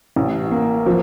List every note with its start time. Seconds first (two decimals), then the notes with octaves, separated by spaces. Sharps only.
0.16 A1
0.51 A#3
0.86 F3